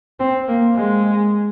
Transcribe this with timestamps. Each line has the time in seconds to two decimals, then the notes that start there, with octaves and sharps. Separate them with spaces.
0.20 C4
0.48 A#3
0.76 G#3